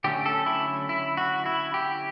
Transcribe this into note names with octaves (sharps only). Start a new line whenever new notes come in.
D3 F#3 A3 C#4 G4
A4
E4
E4
F#4
E4
G4